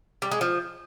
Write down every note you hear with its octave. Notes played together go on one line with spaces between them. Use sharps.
G3
G#3
F3